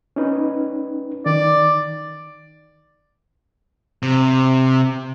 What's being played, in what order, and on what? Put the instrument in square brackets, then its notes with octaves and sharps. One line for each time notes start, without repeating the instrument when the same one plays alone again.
[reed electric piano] C#4 D#4 B4
[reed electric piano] D#3 [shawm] D5
[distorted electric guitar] C3